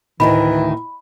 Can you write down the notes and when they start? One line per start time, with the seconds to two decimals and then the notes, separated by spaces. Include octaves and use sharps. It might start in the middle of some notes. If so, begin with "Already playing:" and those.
0.20 D2 A2 D#3 E3 E4 D#5 B5